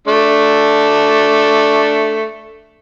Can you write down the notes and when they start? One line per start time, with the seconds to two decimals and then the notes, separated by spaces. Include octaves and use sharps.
0.08 A3 D4